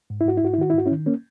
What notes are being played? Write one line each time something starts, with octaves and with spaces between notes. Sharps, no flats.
G#2
E4
G#2 F#4
E4
G#2 F#4
E4
D#3 F#4
E4
G#2 F#4
C#4 E4
D#3
A#3 C#4